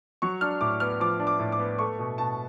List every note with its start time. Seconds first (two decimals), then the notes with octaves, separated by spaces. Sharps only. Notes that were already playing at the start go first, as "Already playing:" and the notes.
0.22 F#3 C#6
0.41 D4 F6
0.61 A2 D6
0.80 B3 F6
1.00 F3 D6
1.20 D4
1.27 D6
1.40 A2
1.52 D6
1.59 B3
1.79 A3 C#6
1.99 B2
2.18 B2 A5